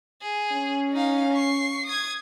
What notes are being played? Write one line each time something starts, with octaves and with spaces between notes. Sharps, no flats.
G#4
C#4
D#4 F5
C#6 C7
D#6 G#6